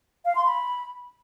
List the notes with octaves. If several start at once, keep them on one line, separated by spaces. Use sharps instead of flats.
F5
C6
B5